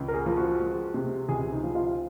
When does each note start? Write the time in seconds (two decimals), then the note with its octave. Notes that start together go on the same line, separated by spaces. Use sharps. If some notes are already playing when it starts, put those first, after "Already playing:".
Already playing: C#2
0.08 A#4
0.14 G#4
0.26 F3
0.37 F#4
0.61 G#3
0.94 C3
1.28 C#2 G#4
1.53 D#4
1.64 F3
1.75 F4